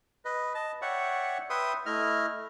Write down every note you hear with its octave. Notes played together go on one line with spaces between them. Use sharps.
B4 D#5
D#5 A5
C#5 D5 E5 F#5 G5 C#6
B4 E5 G5 C6 D#6
A3 E4 D#5 F6